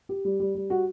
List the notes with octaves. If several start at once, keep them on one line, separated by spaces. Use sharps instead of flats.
G4
G3
G3
G3
F#4